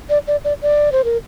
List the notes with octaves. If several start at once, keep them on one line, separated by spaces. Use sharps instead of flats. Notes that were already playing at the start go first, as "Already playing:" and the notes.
D5
D5
D5
D5
C5
A#4